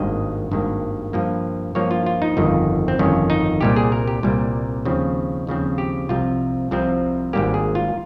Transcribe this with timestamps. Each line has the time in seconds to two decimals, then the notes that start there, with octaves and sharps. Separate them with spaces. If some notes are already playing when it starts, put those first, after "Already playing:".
Already playing: G#1 G2 D#3 A#3 D#5
0.51 G#1 G2 D#3 A#3
1.13 G2 F3 A#3
1.75 G2 F3 A#3 C#5
1.91 F4
2.06 F4
2.22 D#4
2.37 G1 F2 D#3
2.88 C4
2.99 G1 F2 D#3 C#4
3.30 D#4
3.61 C2 A#2 G3 G4
3.76 G#4
3.92 A#4
4.08 G4
4.23 C2 A#2 G3
4.85 D#2 C#3 F3 C4
5.47 D#2 C#3 F3 C4
5.78 G4
6.09 C2 C3 F3 C4 F4
6.71 C2 C3 F3 C4
7.33 G#1 G#2 G3 A#3 G4
7.54 G#4
7.75 F4